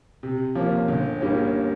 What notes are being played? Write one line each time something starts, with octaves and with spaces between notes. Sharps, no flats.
C3
F3 A#3 C#4
G1
G2 G3 A#3 C#4